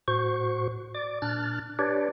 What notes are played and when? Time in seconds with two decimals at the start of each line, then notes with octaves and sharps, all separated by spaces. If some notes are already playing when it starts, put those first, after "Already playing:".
0.08 A2 F#4 C5 C#6
0.95 D5 D6
1.22 A#2 D4 F6 F#6 A6
1.79 D4 G4 B4 C#5 D5